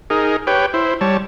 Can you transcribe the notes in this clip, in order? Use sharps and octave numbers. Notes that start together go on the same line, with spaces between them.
D#4 G#4 A#4
G4 B4 C#5 G5
E4 C5
G3 C#5 A5